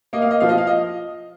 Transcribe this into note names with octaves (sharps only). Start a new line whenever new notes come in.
A#3 D#5
F5
D#5
F3 F5
D#5
F5
D#5